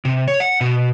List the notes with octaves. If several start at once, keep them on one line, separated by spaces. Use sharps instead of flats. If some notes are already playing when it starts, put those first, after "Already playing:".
C3
C#5
F#5
B2